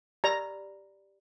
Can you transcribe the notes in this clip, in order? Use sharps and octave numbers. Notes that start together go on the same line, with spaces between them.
G4 D5 A#5 B5